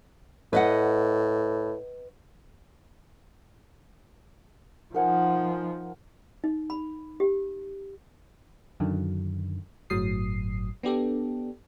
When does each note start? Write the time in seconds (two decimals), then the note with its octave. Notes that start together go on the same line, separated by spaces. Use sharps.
0.53 A2 B4 D#5 F#5
4.94 F3 D#4 A#4 F#5 G#5
6.44 D#4
6.70 B5
7.20 G4
8.80 F#2 D3 D#3 F#3
9.90 G1 A2 F#3 D#6 C7
10.83 B3 D4 G4 A4